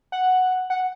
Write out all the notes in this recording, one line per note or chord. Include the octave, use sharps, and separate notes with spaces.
F#5
F#5